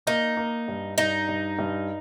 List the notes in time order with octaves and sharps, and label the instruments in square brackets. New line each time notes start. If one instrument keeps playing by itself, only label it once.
[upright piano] A#3 [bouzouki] D#4
[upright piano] A#3
G2
[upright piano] G2 [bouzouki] D#4
[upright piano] G2
G2